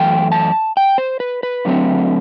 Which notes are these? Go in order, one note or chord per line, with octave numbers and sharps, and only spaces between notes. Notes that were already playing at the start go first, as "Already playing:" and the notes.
Already playing: F#2 E3 A3 G5
A5
G5
C5
B4
B4
D3 F#3 A3 C4